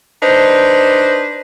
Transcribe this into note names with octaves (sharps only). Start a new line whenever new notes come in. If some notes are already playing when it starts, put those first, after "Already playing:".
D4 D#4 B4 C5